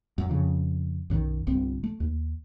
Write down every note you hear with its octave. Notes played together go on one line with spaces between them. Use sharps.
F#2
F2 C#3
B1 F#2 D#3
G1 C2 C4
A3
D#2